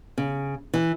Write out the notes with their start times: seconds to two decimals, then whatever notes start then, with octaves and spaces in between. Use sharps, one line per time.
0.18 C#3
0.74 E3